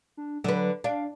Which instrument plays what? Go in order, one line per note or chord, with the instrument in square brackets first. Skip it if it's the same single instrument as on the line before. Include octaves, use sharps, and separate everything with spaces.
[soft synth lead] D4
[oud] D3 B4 [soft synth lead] F#3
[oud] D4 [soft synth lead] F5